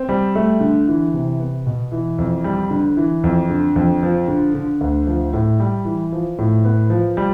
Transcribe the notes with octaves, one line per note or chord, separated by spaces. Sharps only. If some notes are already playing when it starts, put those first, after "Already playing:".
Already playing: C4
G3
A3
D3
E3
C3
B3
B2
E3
F2
G3
D3
E3
F2
D3
F2
F3
D3
D3
D2
F3
A2
G3
E3
F3
A2
B3
F3
G3